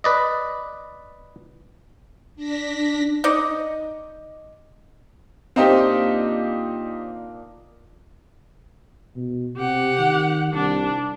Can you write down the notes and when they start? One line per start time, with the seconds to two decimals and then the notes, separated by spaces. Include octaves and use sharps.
0.04 B4 D5 D#5
2.36 D4 A#6 B6
3.24 D#4 D5 D#5
5.56 A#2 C4 D4 D#4 G4 F5
9.16 B2
9.57 C3 G4 F#5
9.99 D#3
10.53 C2 D4